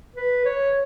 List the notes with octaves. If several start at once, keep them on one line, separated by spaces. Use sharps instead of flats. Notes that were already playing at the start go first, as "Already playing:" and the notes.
B4
C#5